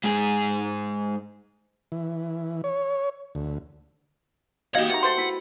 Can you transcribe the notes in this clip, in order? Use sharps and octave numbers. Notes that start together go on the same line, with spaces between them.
G#2 G#4
E3
C#5
D2
A#3 D#4 F#4 G4 D#5 F5 F#5 G#6
C3 D#3 F#5 A#5
A3 C5 C6
E4 B4 B5